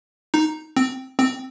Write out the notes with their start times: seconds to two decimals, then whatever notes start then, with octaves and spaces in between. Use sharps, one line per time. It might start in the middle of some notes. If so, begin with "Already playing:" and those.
0.34 D#4
0.77 C4
1.19 C4